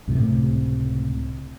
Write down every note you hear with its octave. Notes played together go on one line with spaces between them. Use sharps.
C#2 A2 C3 A3